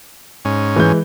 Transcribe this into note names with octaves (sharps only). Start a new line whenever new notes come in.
G#2 C#4
E3 G#3 G6